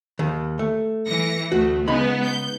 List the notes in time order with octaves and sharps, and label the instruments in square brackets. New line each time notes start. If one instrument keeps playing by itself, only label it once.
[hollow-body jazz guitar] D#2 D#3
A3
[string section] E3 A#6 C#7
[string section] D2 A3 [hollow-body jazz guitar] F#4
[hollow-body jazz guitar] C#3 D#4 B5 [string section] G#3 B3
[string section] G6